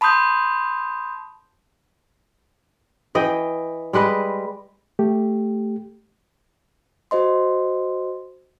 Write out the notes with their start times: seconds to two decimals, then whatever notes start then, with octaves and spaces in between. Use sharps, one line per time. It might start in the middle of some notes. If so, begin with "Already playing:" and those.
0.01 A5 B5 C6 D#6 G6
3.15 E3 D#5 G5
3.93 G3 G#3 B4 D#5
4.99 A3 G4
7.11 F#4 C5 D#5 C6